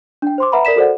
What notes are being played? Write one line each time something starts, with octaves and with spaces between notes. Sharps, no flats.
D4 G5
C5 C6 D6
B4 E5 F#5 A#5 B5
A#4 D5 B6 E7
F#4 A4 C5 D5 F#5